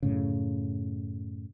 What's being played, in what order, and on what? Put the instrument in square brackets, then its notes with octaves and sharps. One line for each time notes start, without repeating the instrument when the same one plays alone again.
[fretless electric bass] F#2 A2 C#3